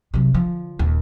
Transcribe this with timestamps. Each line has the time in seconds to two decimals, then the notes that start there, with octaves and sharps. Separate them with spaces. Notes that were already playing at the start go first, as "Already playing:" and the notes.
0.14 C3 F#3
0.35 D3 F3
0.79 D#1 D#2